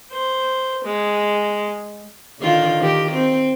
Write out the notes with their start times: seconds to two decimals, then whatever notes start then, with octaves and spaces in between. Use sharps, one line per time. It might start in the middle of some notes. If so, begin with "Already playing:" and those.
0.11 C5
0.84 G#3
2.40 D3 D#3 F4
2.80 D#3 G4
3.12 C4